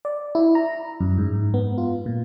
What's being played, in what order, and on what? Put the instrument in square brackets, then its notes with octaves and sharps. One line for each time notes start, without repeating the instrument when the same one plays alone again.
[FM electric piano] D5
E4
A#5
F#2
G#2
B3
F4
A#2